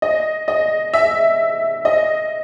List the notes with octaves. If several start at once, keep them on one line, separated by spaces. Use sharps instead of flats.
D#5
D#5
E5
D#5